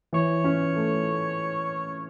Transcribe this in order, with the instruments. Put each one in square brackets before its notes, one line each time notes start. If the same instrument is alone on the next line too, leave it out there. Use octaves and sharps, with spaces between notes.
[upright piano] E3 [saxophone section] C#5
[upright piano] C#4
A3